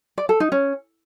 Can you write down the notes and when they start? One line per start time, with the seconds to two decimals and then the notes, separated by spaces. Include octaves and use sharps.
0.18 D5
0.29 A4
0.40 D#4
0.52 C#4